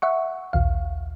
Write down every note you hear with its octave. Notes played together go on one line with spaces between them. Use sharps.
E5 F#5 C#6
A#1 D#2 F5